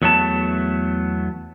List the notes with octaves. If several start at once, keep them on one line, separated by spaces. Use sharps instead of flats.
E2 F#3 A3 B3 A5